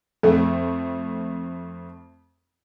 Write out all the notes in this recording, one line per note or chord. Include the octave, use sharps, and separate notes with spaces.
F2 A3 C4 A4